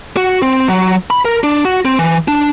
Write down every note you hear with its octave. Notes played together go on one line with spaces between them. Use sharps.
F#4
C4
F#3
B5
A#4
D4
F#4
C4
E3
D4